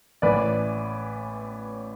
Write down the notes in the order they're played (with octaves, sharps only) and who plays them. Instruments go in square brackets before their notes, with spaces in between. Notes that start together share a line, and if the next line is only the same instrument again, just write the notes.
[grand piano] A1 A2 E3 B4 D5